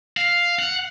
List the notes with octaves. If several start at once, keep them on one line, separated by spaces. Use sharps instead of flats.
F5
F#5